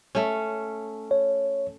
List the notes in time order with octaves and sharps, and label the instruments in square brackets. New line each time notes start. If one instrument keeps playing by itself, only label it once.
[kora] A3 C#4
[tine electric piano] C#5